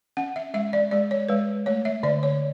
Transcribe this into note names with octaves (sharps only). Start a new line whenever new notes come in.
C#4 F#5
E5
G#3 E5
D5
G#3 D5
C#5
G#3 B4
A3 C#5
E5
D3 D5
C#5